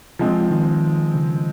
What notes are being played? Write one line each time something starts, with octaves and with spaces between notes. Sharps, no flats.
F3 G#3 C4
D#3
C#3